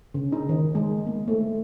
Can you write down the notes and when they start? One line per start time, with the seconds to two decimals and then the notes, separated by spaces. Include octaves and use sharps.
0.14 C#3
0.32 D#4
0.49 D#3
0.75 G#3
1.07 A#3
1.28 A3